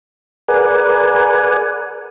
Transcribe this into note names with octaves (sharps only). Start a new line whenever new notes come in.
G#4 A#4 B4 D5 F#5 G#5